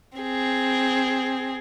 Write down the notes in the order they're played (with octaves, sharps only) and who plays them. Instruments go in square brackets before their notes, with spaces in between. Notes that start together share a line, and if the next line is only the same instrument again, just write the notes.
[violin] C4 G#4